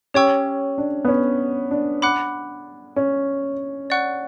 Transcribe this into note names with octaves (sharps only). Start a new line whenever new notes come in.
C#4 G4 C#5 G5 C#6 E6
D4
B3
C#4
D4
F#5 B5 D6 F#6
C#4
D5 F#5 C#6 F#6